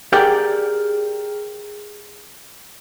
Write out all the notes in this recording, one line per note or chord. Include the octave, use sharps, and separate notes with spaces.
G4 G#4 A#4 D5 F#5 G5